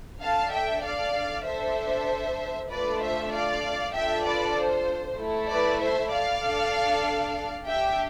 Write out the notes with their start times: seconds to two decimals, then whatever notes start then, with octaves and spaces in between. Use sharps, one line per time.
0.22 D4 A4 F5 A5
0.53 E5 G5
0.84 D5 F5
1.47 D4 A4 C5 E5
2.71 A3 D4 F4 A4 B4 D5
3.02 C5 E5
3.33 D5 F5
3.95 D4 F4 A4 E5 G5
4.26 B4 D5
4.56 C5
5.19 A3 E4 A4
5.50 B4 D5
5.81 C5 E5
6.12 D5 F5
6.44 D4 A4
7.67 D4 G4 E5 G5